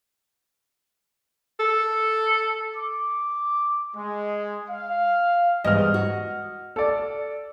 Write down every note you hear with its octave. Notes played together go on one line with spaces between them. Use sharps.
A4
D6
G#3
F5
E2 G#2 G3 D#5 F6
F#4
A4 D5